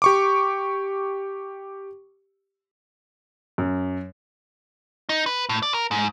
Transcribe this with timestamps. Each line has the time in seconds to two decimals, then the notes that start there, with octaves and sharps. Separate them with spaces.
0.02 G4 C#6 D6
3.58 F#2
5.09 D#4
5.26 B4
5.49 A2
5.63 D5
5.74 A#4
5.91 G#2